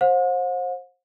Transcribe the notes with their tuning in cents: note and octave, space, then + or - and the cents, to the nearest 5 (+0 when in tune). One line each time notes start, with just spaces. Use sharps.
C5 +25 F#5 -45